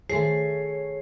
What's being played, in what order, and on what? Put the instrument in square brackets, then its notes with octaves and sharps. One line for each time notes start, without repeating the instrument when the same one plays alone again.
[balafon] D#3 C5 [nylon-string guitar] A3 G#4 [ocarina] C#5 [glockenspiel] C7